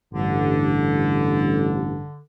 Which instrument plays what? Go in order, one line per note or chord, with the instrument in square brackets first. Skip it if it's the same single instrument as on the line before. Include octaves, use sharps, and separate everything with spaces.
[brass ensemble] A1 G2 [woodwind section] D3